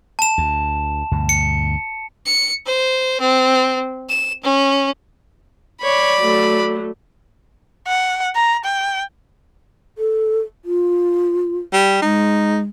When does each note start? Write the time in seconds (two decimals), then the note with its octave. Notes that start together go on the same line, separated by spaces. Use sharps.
0.19 A5 E7
0.38 D2
1.12 D2 G2 B2
1.29 C#7
2.26 C#7
2.66 C5
3.20 C4
4.09 E7
4.43 C#4
5.83 C#5 D5 B5
6.19 F#3 A3
7.88 F#5
8.35 A#5
8.64 G5
9.98 A4
10.65 F4
11.73 G3
12.02 G#3 D#4